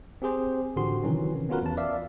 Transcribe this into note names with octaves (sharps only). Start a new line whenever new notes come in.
C4 G4 G#4 C5
A1 D3 F3 F#4 G4 C6
C3 D#3 E3 F#3 C#4
B3 C#4 F4 F#4 A#4 B4
E2 A5
D5 E5 F5